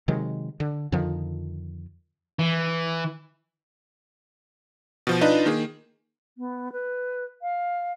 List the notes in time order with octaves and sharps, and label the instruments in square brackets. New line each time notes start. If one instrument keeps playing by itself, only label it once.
[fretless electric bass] C3 D#3 F#3 G#3
D3
F2 D3 D#3 F3
[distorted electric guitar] E3
[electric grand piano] B2 F3
D4 D#4 F4 B4 D#5
D#3 A#3 G#4
[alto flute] B3
B4
F5